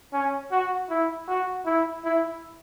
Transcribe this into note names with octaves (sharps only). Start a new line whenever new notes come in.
C#4
F#4
E4
F#4
E4
E4